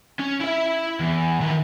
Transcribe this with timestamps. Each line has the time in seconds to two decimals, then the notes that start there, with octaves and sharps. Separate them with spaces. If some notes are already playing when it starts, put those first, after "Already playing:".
0.19 C#4
0.40 E4 E5
1.00 E2
1.41 D#3 E3